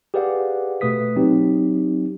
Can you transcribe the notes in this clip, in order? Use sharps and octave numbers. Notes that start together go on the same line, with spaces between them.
G4 G#4 B4 D5 F5 F#5
B2 A3 B4 D#6 B6
F#3 C4 D#4 G4